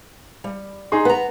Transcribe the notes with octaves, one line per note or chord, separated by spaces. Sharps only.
G3
D#4 G#4 C6
B3 B4 A#5